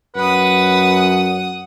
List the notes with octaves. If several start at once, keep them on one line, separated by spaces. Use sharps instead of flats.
F#2 B4 F#5 D#6